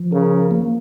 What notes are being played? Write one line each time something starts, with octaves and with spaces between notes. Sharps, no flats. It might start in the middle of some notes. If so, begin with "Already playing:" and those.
Already playing: F3
C#3 A#4
A#3